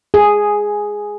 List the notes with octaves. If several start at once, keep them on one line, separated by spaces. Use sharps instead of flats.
G#4